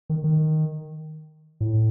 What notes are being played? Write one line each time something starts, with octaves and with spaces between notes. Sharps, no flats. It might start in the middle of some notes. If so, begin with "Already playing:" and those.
D#3
D#3
A2